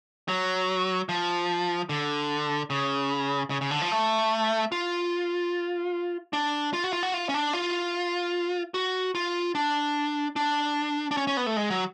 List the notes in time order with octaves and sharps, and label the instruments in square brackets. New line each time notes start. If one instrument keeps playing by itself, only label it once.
[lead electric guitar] F#3
F3
D3
C#3
C#3
C#3
D3
F3
A3
F4
D4
F4
F#4
F4
F#4
F4
C#4
D4
F4
F#4
F4
D4
D4
D4
C#4
C#4
B3
A3
G#3
F#3